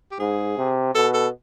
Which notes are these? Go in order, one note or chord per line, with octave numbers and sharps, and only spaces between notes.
G4
G#2 G#4
C3
B2 A4
A4